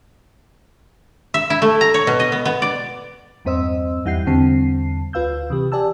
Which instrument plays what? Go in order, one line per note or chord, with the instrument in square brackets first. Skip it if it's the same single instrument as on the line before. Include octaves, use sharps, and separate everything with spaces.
[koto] E5
E4
A3
A#5
C#5
B2
D#5
B3
B3
D5
[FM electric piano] E2 G2 C4 C5 D#5 E6
E2 G3 E4 F#5 G6 C7
E2 D3 G3 C4 A5 C7
D2 F4 B4 F5 E6 G6
C3 E3 G4
G4 D5 G#5 A5 E6